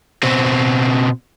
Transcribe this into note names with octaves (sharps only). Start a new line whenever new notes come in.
B2 C4